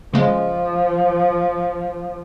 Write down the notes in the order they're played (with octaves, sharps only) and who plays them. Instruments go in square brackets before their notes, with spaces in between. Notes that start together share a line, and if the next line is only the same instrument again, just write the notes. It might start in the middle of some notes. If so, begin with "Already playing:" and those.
[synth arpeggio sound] C#3 G#3 [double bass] F3